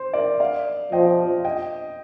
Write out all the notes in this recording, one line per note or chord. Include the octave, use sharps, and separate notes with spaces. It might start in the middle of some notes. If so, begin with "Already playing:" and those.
Already playing: C5
A#4 D5
D5 F5
F3 D#5 G5
D#5 G5